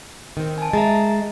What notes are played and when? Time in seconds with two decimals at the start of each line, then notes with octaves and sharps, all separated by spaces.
0.37 D#3 C4
0.58 G#5 A5
0.73 G#3 E5 A#5 A6